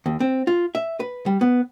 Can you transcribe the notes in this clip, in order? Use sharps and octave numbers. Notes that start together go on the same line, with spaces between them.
D#2
C4
F4
E5
B4
G3
B3